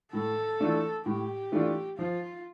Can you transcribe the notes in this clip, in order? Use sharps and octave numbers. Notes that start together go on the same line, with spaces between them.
A2 A4
E3 A3 D4 F4
A2 G4
E3 A3 D4 F4
F3 F4